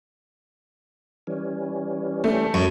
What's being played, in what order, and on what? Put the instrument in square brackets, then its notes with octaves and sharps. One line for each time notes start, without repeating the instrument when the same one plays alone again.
[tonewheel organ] E3 G3 C#4
[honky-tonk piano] A3
[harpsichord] F#2